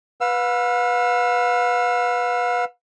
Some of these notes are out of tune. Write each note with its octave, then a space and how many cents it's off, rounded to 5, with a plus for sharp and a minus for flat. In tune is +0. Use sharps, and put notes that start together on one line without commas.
B4 -5 F5 +45 E6 +30